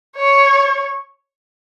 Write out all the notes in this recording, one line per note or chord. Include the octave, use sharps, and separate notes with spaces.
C#5